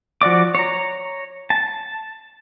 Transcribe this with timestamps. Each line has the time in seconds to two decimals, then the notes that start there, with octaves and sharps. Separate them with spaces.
0.21 F3 F#4 D5 D6
0.55 C#5 A#5
1.50 A5